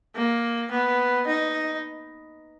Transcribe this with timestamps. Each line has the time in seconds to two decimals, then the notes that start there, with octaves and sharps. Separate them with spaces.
0.16 A#3
0.72 B3
1.27 D#4